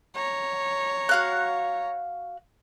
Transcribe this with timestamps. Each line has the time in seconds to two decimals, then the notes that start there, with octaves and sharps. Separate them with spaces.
0.15 C#5 A#5
1.09 F#4 F5 F#6